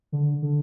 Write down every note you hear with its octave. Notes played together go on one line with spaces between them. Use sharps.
D3
D3